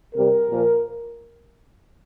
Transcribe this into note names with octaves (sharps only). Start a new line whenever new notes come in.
C3 G3 A#4
A#2 F3